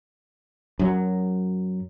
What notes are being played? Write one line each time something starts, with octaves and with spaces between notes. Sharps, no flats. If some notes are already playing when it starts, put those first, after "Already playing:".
F#2 F#3